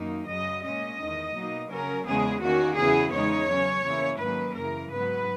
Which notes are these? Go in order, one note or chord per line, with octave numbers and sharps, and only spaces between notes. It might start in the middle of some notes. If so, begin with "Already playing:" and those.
Already playing: F#2 D#3 A#3 D#4
F#2 C#3 F#3 D#5
A#2 G#3 C#4 D#5
E2 D#3 G#3
B2 F#3 A#3 D#4
C#3 F#3 C#4 A#4
E2 C#3 G#3 B3 G#4
D#3 A#3 C#4 F#4
E2 C#3 F#3 B3 E4 G#4
E2 C#3 G#3 D#4 C#5
C#3 F#3 C#4
C#3 E3 A#3 C#4 E4
G#2 D#3 F#3 A#3 C#4 B4
F#2 C#3 E3 A#4
G#2 F#3 B3 B4